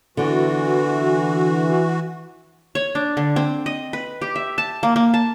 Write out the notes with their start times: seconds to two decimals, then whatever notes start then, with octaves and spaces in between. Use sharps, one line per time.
0.17 D3 E3 B3 F#4
2.75 C#5
2.95 D4
3.17 D3
3.36 C4
3.66 D#5
3.93 B4
4.21 G4
4.36 E5
4.58 A5
4.83 A#3
4.96 A#3
5.14 A5